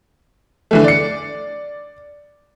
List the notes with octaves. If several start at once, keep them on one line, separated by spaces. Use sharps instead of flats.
D3 E3 A3
D5 C#7